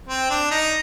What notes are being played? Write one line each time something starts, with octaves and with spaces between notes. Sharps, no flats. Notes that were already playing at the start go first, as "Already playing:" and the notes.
C4
D4
D#4